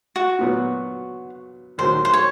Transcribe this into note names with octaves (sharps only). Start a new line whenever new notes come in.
F#4
A#2 F#3 B3
D#2 D#3 F#3 C5
C5
C#5